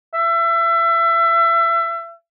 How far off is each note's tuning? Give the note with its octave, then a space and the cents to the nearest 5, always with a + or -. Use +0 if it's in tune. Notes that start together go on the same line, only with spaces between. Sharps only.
E5 +30